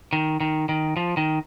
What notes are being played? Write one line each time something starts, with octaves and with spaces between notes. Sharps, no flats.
D#3
D#3
D#3
F3
D#3